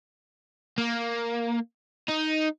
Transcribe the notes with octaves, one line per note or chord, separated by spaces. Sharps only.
A#3
D#4